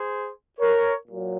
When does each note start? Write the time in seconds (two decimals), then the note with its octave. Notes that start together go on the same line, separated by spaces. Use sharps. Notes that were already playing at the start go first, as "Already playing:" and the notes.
Already playing: G#4 C5
0.59 A#4 C#5
1.08 A#2 F#3